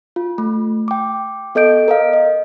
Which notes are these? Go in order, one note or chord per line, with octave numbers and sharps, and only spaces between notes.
F4
A3
G5 D6
B3 A4 D#5 G6 D7
A#4 D#5 F5
D#5